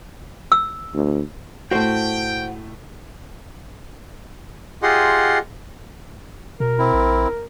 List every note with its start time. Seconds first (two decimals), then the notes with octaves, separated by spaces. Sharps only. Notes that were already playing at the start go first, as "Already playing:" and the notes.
0.52 E6
0.94 D2
1.71 A2 A3 F#4 C5 G5
4.83 F4 G4 G#4 D#5 F#5 C6
6.60 B2 A#4
6.79 C4 E4
6.94 A#1